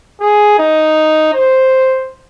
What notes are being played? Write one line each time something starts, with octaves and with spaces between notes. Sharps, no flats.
G#4
D#4
C5